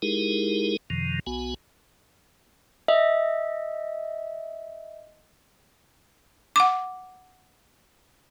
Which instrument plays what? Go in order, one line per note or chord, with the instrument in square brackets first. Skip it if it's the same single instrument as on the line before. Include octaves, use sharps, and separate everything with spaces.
[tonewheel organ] G#3 D#4 E4 G4 G#4 A#4
F#2 C3 D#3 F3
B1 B3 F#4 G#5
[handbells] D#5 E5
[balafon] F#5 D6